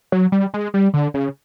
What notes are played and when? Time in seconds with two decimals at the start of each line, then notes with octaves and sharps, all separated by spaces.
0.12 F#3
0.32 G3
0.54 G#3
0.74 G3
0.94 D3
1.14 C#3